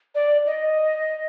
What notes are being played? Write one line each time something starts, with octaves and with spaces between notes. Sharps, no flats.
D5
D#5